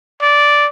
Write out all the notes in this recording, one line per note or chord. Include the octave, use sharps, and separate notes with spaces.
D5